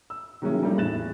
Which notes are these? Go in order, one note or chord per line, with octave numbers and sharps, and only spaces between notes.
E6
D#3 F#3 G#3 A#3 C#4 E4
F3 G3 A3 A#3 D#4 E4
E2 A2 F#6 A6 E7